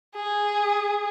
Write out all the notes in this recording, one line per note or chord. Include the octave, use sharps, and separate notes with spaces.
G#4